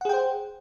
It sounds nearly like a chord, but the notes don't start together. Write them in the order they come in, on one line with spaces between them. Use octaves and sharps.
F#5 G#4 G5 C5